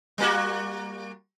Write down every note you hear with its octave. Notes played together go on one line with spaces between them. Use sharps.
G3 A#3 F#4